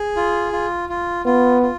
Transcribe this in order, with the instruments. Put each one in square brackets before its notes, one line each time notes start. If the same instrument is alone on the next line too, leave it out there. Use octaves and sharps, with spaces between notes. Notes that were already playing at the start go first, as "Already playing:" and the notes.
Already playing: [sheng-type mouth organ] G#4
F4
F4
F4
[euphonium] B3 [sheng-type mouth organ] F4
[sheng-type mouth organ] F4